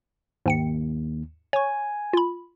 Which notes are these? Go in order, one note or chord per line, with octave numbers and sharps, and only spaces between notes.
D#2 G#2 G5 C#7
C#5 G#5 C#6
F4 B5